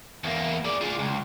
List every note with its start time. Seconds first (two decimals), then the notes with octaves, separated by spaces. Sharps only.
0.24 E2 A#3
0.65 G#4 D5
0.81 F4 G#4
0.99 C#2